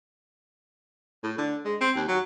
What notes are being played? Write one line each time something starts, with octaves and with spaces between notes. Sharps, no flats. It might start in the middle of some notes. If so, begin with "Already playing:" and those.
A2
D3
G#3
C4
D#2
F#3